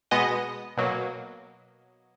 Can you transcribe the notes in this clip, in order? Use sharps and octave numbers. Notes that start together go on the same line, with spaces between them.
B2 G#3 B3 D#5
B2 F#3 A#3